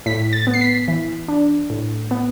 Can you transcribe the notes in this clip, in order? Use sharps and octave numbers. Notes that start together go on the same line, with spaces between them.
A2 B6
A6
B3
C7
B6
E3
D4
A2
B3